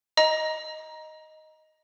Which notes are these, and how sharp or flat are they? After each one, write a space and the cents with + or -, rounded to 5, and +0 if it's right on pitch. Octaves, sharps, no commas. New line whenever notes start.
D#5 +0 A#5 +20